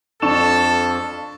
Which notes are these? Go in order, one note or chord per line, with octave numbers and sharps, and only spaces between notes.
F2 D4 A4 C#6 E7